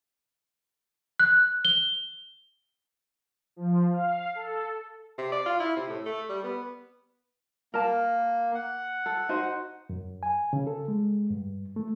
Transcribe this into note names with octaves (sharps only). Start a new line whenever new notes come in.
F#6
G7
F3
F5
A4
C3
D5
F4
E4
C3
A2
A3
G3
B3
A#3 A#4 A5
F#5
A4
D#4 F#4 C5
F#2
G#5
C#3
A4
G#3
G2
A3